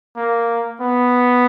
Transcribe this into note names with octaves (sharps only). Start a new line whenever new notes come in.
A#3
B3